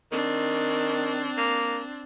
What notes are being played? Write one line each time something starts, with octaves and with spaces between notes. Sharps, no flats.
D#3 C4 D4
A#3